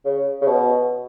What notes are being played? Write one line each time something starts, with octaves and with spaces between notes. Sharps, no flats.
C#3
C#3
B2